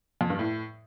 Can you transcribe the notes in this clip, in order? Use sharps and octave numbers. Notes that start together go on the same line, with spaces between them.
F2
G2
A2